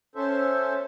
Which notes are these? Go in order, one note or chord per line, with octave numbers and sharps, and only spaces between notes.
C#4 A4 C5 E5